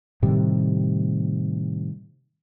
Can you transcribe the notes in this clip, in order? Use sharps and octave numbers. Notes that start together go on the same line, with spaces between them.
A2 C3 D#3 G3